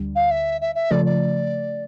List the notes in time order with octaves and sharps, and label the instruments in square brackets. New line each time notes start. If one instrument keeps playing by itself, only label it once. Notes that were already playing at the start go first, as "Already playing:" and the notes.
Already playing: [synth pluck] D2 D3 G3
[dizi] F5
E5
E5
E5
[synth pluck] C#3 F3 A3 [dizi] D5
[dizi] D5